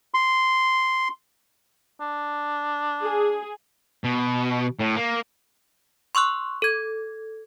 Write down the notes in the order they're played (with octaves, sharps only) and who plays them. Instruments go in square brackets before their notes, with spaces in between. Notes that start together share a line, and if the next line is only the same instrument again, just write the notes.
[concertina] C6
[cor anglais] D4
[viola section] G#4
[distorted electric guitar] B2
A2
A#3
[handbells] C6 C#6 E6 F#6
A4 G#6